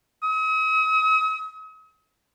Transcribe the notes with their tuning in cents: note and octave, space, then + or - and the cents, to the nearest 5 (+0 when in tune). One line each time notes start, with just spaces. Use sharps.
D#6 +45